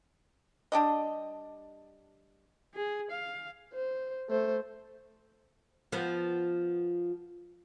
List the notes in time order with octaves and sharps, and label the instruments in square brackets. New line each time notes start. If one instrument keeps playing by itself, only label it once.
[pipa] G3 D4 G4 D#5
[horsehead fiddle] G#4
F5
[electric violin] C5
A3 C5
[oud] F3 B3